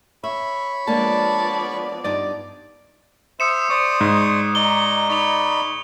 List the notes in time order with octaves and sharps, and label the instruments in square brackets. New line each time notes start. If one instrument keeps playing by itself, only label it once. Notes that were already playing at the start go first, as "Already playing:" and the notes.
[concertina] C#5 B5 [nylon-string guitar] E5
[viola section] F3 B3 D5 [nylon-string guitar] G#3 A#3 D4 [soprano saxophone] A5
[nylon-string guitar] G2 D#4 A5 [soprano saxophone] D5
[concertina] C5 E5 [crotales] D#6 C#7 E7
[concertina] C5 D5 D#6 [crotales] C#6
[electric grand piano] G#2
[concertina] D#4 D5 A#5 [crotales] G7
[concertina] D#4 D5 B5 [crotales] C#6 F7